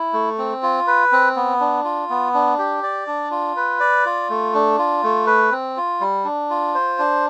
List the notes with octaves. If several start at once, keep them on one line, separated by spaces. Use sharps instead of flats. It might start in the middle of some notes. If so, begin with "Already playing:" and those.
Already playing: E4
A3
C4
F4
B4
C4
B3
D4
F4
B3
D4
G4
D5
D4
F4
B4
D5
F4
A3
D4
F4
A3
B4
C4
F4
G3
D4
F4
C5
D4